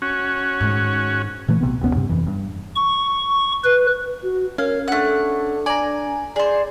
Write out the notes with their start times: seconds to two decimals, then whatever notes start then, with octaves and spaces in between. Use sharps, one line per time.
0.02 C#4 F#4
0.60 G#2 D#3
1.48 A#2 E3 A3
1.61 B1 C3 B3
1.81 F#1 D#2 B3 C#4
1.96 G2 C3
2.09 F2 E3
2.27 G2
2.76 C#6
3.64 B4
4.23 F#4
4.58 C#4 A#4 F5
4.88 A3 D4 F#5
5.66 D5 G#5 A#5
6.36 G#4 C5 D5